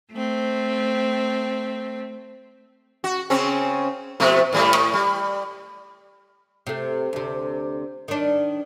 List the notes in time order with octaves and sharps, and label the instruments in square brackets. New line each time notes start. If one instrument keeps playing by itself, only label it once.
[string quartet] A3 C4
[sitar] F#4
C#3 C4 C#4
B2 F3 A3
A2 G3 A3
A2
G3
[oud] C3 A3
D2 C3
D#3 D4